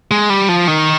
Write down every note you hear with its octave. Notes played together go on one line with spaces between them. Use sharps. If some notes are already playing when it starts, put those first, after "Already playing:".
G#3
G3
F3
D#3